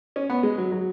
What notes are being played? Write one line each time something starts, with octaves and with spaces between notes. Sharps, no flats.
C#4
B3
G#3
F#3
F#3